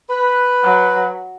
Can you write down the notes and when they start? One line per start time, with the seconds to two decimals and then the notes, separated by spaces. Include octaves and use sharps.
0.10 B4
0.63 F#3